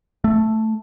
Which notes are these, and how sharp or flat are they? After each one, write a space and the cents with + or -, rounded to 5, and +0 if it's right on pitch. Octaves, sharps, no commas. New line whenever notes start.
A3 +0